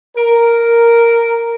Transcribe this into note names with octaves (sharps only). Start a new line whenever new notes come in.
A#4